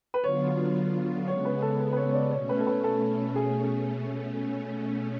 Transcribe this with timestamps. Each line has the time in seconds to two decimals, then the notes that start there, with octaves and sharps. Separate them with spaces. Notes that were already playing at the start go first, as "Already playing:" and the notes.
0.14 B4
0.23 D3 F#3 B3 F4 C#5
1.27 C#3 G#3 B3 C#5
1.45 B4
1.62 A4
1.80 B4
1.93 B4
1.96 C#5
2.09 C#5
2.14 D5
2.31 B2 A3 C#4 C#5
2.49 B4
2.60 A4
2.67 B4
2.84 A4
3.36 G#4